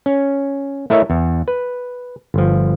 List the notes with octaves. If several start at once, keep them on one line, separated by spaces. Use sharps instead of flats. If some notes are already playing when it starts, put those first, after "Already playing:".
C#4
A3 E4 A#4 C#5 D#5 E5
E2
B4
G1 F3